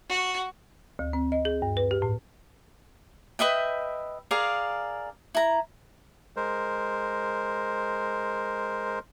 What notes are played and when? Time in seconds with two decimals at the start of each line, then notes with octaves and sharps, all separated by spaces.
0.11 F#4
0.99 D2
1.13 C4
1.32 D#5
1.45 G#4
1.62 G2
1.77 B4
1.91 G4
2.02 A2
3.39 B4 D#5 E5 G5
4.31 G#4 A#4 D5 F5
5.35 E4 A#5
6.36 G#3 A#4 C5